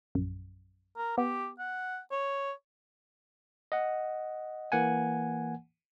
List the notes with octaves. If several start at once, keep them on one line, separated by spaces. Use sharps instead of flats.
A#1 F#2
A#4
B3 G4
F#5
C#5
D#5 F#5
E3 A#3 F#5 G#5